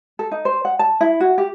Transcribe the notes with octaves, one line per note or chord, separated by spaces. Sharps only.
A4
D#4
C5
F#5
A5
E4
F#4
G4